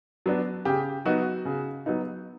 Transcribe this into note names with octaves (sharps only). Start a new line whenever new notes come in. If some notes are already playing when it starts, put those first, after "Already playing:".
F#3 B3 D4
C#3 G4
F#3 B3 D#4 F#4
C#3
F#3 B3 D#4